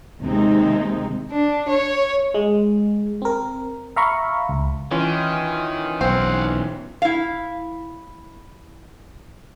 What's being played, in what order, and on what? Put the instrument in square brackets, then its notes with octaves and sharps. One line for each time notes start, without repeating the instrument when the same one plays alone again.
[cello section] D#2 C3 G#3 C4 D#4
[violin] D4
C#5
[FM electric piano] G#3
C4 A#4
E5 F5 A#5 B5 C#6
C#2
[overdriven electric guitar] D#3 [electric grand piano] E3 C#4 F4
[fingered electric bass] B1 [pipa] C4 [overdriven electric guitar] F5 F#5
[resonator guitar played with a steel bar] E4 F5